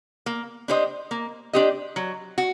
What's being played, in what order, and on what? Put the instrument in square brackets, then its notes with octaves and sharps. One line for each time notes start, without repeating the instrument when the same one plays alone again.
[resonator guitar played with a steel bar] A#3
D4 G4 C5 D#5
A#3
D4 G4 C5 D#5
F#3
F#4